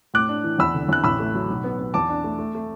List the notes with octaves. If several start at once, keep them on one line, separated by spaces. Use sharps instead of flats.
A2 D6 F#6
D4
E3
E2 B5 E6
D3
E2 F#6
A1 B5 E6
A3
F#3
B1
B3
B3
E2 A5 D6
D4
A3
A3
A3